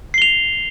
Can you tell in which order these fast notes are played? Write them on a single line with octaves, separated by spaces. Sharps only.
C7 G7 F7